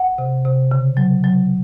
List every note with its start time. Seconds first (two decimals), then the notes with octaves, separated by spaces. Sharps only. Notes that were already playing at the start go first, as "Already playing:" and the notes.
Already playing: F#5
0.18 C3
0.45 C3
0.71 C#3
0.97 F#3
1.24 F#3